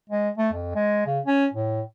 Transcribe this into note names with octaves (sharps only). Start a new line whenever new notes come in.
G#3
A3
F2
G#3
C#3
C#4
A2